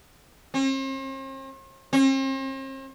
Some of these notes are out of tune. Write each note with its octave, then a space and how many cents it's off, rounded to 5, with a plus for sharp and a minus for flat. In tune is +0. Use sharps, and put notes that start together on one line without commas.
C4 +45
C4 +45